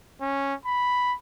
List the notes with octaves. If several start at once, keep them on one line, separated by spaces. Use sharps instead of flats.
C#4
B5